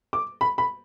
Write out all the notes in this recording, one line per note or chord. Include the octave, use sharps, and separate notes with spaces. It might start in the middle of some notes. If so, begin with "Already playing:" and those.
D6
B5
B5